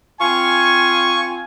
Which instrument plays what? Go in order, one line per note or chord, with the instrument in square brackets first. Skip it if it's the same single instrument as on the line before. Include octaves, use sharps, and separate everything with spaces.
[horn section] C4 F4 G#5 [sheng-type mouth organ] C#6